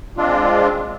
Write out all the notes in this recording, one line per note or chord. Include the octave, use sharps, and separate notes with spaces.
G#3 C4 D4 F4